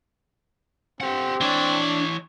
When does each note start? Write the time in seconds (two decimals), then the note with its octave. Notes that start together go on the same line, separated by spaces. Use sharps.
1.01 C4 G4 F#5
1.41 E3 D4 C#5